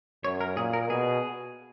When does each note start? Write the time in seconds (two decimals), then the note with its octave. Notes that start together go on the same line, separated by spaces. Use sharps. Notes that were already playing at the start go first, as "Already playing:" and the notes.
0.24 F#2 C#5
0.41 A#4
0.57 A#2 G#4
0.73 A#4
0.89 B2 G#4